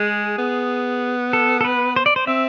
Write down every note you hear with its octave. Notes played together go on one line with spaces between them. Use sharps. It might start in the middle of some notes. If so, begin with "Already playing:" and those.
Already playing: G#3 G#4
B3
A4
A4
B4
C5
D5
C5
C4 E5